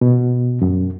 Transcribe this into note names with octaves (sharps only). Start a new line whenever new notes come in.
B2
F#2